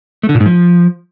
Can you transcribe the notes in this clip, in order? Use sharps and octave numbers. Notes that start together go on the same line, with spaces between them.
A3
D3
A#2
G#2
F3